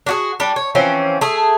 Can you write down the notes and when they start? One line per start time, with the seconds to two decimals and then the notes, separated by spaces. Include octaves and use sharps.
0.06 D4 F#4 G#4
0.40 G3 D4
0.56 C#5
0.75 E3 F3 C4 C#4
1.21 A3 G#4